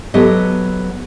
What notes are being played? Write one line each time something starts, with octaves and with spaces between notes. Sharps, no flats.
F#3 B3 G4 A4 D#5